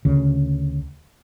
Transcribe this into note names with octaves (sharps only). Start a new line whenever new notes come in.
D2 C#3